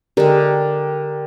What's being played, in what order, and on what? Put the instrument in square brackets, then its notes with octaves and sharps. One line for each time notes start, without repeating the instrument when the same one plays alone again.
[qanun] D3 G#3 [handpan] G4 A#4